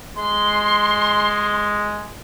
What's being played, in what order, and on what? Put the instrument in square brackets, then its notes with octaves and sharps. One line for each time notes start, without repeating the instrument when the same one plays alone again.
[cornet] G#3 [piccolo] C6